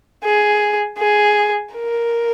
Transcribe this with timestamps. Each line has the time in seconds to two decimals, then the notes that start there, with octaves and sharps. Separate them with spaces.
0.24 G#4
0.98 G#4
1.74 A#4